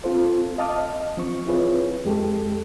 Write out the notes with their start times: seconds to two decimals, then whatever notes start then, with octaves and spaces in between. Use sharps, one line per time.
0.04 C4 F4 A4 C5
0.58 D#5 F5 A5 D6 D#6 F6
0.78 D#5
1.17 F3 C4 C#6
1.46 C4 E4 F4 G#4 B4 C#5
2.05 F2 G#3 G4 A4